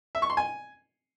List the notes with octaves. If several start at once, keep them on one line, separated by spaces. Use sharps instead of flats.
E5
C#6
C6
G#5